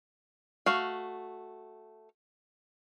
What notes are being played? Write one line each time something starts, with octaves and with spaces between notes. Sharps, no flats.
A3 F#4 F5